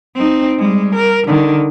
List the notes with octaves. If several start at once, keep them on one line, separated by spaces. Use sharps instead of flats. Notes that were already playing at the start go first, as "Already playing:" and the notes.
C4 D#4
G3 G#3
A#4
D3 D#3